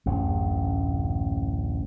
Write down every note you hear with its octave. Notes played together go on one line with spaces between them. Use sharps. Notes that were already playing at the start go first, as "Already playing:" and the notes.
D1 A1 F#2